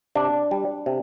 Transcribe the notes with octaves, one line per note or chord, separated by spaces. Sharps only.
C3 D4
G3
C3